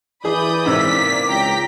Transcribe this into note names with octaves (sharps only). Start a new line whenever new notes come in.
E3 G#4 D5 B5 D#6 G6
G#2 C3 A#3 E6 B6
C#2 G5 A#5 B6